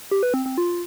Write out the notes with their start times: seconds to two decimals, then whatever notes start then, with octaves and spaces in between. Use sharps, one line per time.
0.11 G4
0.23 B4
0.34 C4
0.46 C4
0.58 F4